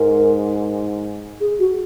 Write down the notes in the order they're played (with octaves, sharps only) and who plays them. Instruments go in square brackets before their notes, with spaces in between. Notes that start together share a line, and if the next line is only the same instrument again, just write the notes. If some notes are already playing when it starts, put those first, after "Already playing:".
Already playing: [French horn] G#2 [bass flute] A#4
[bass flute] G#4
F#4